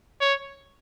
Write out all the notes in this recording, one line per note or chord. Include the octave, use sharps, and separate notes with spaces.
C#5